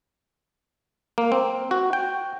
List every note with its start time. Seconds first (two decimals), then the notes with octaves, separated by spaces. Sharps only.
1.18 A#3
1.32 C4
1.71 F#4
1.93 G5